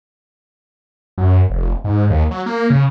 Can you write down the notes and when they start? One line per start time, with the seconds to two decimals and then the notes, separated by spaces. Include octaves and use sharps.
1.18 F#2
1.50 F1
1.84 G#2
2.10 D#2
2.31 F#3
2.46 A#3
2.70 C#3